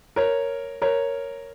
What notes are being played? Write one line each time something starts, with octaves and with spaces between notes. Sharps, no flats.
A#4 C#5
A#4 C#5